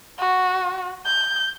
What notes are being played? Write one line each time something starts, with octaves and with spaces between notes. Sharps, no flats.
F#4
G6